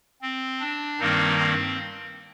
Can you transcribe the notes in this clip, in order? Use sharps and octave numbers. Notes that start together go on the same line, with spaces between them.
C4
D4
G2 D#3 G3 A#3 C4 D#4
C4